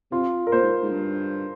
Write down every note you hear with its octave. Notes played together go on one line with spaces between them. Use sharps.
C3 F4
A#4
A#2 C5
G#2
G#2
G2